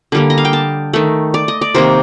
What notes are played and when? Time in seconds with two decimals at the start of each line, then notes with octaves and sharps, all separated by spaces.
0.12 D3 G3 A#3
0.30 D#5
0.38 F5
0.45 G5
0.53 A5
0.93 D#3 A3
1.34 D5
1.48 D#5
1.61 D5
1.74 C3 D#3 A#3 C5